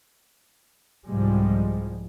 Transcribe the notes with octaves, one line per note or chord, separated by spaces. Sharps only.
C2 G#2 F3 G3 G#3